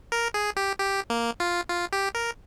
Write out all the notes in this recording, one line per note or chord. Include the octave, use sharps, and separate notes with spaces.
A#4
G#4
G4
G4
A#3
F4
F4
G4
A#4